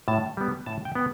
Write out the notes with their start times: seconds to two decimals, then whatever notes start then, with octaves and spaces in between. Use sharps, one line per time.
0.08 A2 A5
0.37 G3 B3
0.66 A2 A5
0.85 G5
0.95 B3